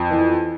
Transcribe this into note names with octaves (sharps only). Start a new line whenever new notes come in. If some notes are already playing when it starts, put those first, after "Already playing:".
Already playing: F2
E3